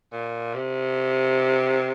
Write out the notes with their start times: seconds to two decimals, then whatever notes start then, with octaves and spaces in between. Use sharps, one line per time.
0.12 A#2
0.54 C3